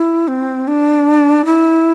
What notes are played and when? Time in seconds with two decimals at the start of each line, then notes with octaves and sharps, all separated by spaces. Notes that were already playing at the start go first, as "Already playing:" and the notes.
Already playing: E4
0.28 C4
0.68 D4
1.45 E4